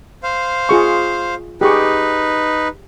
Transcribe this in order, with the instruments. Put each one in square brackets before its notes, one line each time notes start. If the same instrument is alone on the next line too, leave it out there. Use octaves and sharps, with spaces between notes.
[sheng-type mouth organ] C5 F5
[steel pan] F4 G#4 C#6
[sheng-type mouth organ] D#4 B4 [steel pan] G4 G#4 C#6